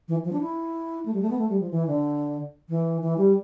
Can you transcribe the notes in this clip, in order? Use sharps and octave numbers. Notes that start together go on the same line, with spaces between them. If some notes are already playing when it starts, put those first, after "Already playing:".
E3
F3
D4
E4
A3
G3
A3
B3
A3
G3
F3
E3
D3
E3
E3
G3